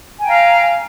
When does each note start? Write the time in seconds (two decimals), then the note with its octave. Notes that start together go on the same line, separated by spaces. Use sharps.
0.19 G#5
0.22 G5
0.26 A#5
0.29 F5